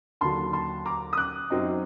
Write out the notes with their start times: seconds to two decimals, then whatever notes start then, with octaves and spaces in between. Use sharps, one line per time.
0.21 D#2 D3 F#3 A5 C6
0.53 A5 C6
0.86 A#5 D6
1.13 D#6
1.17 D6 F#6
1.50 F#2 F#3 C4 D#4